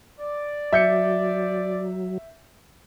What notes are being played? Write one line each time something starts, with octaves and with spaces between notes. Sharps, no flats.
D5
F#3 E5 G6 C#7